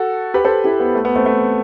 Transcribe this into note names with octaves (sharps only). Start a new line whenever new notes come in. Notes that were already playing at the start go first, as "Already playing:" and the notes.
Already playing: F#4 A4
G4 B4
A4 C5
E4 G4
B3
A3
B3
A3 C4
A3